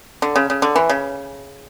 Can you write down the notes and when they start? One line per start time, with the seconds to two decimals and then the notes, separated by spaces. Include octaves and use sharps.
0.22 D3
0.36 C#3
0.50 C#3
0.62 D3
0.76 E3
0.89 C#3